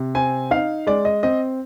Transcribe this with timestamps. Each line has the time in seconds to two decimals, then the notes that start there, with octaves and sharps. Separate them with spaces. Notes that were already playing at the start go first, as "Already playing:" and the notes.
Already playing: C3
0.15 C4 G#5
0.51 D#4 F5
0.87 G#3 D5
1.05 D#5
1.23 C4 D#5